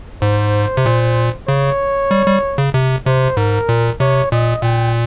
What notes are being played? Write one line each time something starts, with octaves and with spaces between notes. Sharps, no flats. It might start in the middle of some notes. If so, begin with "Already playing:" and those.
G#2 C5
C3
A#2
C#3 C#5
G3
G3
C#3
C3
C3 C5
G#2 A#4
A#2
C3 C#5
A#2 D#5
A#2 G5